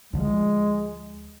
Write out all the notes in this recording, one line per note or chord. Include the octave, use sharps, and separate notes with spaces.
D2 D3 F3 G#3